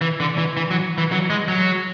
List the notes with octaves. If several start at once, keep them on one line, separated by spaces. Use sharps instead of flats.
E3
D3
E3
E3
F#3
E3
F#3
G#3
F#3